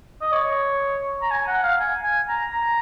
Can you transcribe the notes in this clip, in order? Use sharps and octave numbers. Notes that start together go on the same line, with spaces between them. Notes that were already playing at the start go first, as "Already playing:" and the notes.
D#5
C#5
A#5
G#5
F#5
F5
G#5
G#5
A#5
A#5